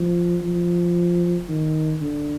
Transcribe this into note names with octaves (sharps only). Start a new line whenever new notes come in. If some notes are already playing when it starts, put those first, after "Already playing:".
Already playing: F3
F3
D#3
D3